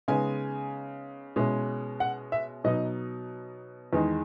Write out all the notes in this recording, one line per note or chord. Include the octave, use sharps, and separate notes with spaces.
C#3 G#3 B3 D#4 G#5
B2 G#3 C#4 E4
F#5
E5
B2 F#3 B3 D#4 D#5
E2 D#3 G#3 D#4